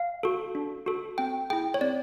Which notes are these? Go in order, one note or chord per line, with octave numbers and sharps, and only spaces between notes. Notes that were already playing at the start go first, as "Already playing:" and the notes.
Already playing: F5
F#4 A4
D4
F#4 A4
C4 G5
E4 G#4 G5
C#5
C4 D5